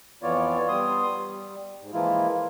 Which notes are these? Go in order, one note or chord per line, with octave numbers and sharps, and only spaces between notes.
F2 E3 B3 F4 C#5 D5
G3 B3 C6 D#6
G3
G#2
E3 F3 G#3 A#3 E4 F4